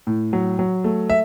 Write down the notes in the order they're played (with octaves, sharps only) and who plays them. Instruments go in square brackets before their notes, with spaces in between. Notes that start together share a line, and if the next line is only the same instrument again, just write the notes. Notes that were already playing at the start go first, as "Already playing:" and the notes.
[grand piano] A2
F#3
F#3
A3
E5